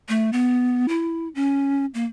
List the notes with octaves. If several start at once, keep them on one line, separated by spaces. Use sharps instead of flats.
A3
B3
E4
C#4
A#3